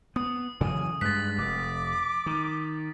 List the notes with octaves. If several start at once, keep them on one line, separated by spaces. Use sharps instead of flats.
B3 D#6
C#3 E3 F#3 G#5
G2 G#3 F#6 A6 B6
F1 D6
D#3